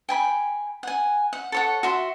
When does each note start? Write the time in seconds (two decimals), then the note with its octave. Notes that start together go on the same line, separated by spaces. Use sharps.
0.09 G5 G#5 B5
0.83 F#5 G#5
1.33 F#5
1.52 A4 C#5 F#5
1.83 F#4 E5 C6